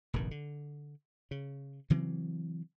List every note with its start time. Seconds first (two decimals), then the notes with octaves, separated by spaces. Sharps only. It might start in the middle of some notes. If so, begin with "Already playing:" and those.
0.14 F1 A#1 G2 D#3
0.31 D3
1.31 C#3
1.90 C#3 E3 F#3 C4